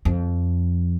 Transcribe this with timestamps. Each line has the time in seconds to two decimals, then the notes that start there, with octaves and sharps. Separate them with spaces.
0.05 F2